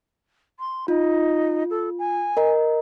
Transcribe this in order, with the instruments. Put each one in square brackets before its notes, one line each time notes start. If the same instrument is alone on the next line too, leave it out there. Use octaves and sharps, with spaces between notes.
[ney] C6
[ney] D#4 [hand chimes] F4
[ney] A4
G#5
[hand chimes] A#4 D#5 A#5